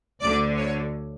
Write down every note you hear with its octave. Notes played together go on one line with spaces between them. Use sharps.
D2 D3 D5
C#5